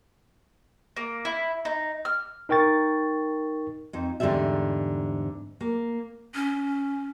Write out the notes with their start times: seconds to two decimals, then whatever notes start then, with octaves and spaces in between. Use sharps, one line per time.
0.97 A#3
1.25 E4
1.65 D#4
2.05 F6
2.49 D#4 A#4 G5 C#6 A6
3.93 F2 F3 D#4
4.20 E2 G#2 D3 G3 A4 E5
5.61 A#3
6.35 C#4